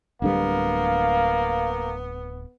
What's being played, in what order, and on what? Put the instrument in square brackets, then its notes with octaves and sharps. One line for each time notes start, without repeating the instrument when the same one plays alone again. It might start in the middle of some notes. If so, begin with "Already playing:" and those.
[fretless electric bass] D1 D3 G3 [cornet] A#3 [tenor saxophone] B3 [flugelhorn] F5